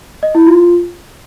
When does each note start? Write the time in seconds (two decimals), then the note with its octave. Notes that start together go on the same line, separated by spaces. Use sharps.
0.23 D#5
0.35 E4
0.47 F4